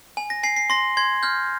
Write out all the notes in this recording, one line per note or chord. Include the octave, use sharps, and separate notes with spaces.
G#5
A#6
G#5 C7
C7
C6 A#6
C6 G#6
F6 G6